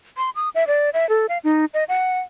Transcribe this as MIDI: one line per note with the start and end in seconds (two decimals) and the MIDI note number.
0.17 0.30 84
0.35 0.49 87
0.55 0.64 76
0.67 0.90 74
0.94 1.08 76
1.09 1.26 69
1.29 1.38 77
1.44 1.65 63
1.74 1.84 75
1.89 2.20 78